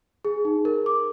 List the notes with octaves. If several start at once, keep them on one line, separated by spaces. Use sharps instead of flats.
G#4
D#4
A#4
D6